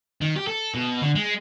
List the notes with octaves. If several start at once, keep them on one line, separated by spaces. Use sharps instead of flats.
D#3
G4
A4
B2
D3
G#3